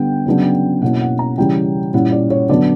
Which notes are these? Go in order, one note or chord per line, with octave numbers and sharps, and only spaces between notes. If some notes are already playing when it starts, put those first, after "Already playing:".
Already playing: D3 G3 B3 G5
C#3 F#3 B3 D4
B2 A#3 C#4 E4 F#5
F#5
A#5
C#3 E3 G3 C#4 G5
A#2 G3 C#4 E4 F#5
D5
C#5
D3 F#3 B3 D4 D5